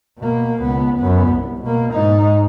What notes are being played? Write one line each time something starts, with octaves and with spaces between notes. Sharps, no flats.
B2 A#3
C#2 B3
F#2 B3
C2
B2 A#3
G#2 D#4